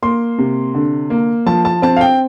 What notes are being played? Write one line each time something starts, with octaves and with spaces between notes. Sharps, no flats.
A#3 C6
C3
D3
A#3
F3 A5
A5
C4 A5
F5
G5